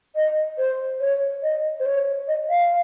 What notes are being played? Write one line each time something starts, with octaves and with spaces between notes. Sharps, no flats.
D#5
C5
C#5
D#5
C5
C#5
D#5
F5